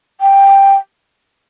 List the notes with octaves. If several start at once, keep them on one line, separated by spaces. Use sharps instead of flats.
G5